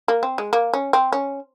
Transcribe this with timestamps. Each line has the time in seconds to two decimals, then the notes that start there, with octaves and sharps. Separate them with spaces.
0.08 A#3
0.23 C4
0.38 G#3
0.53 A#3
0.74 C#4
0.93 C4
1.12 C#4